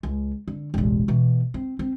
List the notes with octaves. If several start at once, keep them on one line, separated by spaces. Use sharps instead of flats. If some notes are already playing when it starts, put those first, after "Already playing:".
C#2
D3
E1 A1
B2 E3
C4
C4